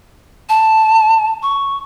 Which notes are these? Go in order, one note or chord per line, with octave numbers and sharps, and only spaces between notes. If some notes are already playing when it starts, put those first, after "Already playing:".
A5
C#6